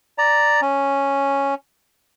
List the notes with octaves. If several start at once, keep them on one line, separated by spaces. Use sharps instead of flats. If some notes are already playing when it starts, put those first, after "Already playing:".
D5 A#5
C#4